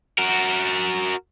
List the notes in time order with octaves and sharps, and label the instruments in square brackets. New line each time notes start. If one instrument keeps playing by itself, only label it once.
[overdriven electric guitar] F#4 A#4